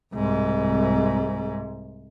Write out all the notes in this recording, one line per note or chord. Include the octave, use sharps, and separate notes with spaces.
C2 G#2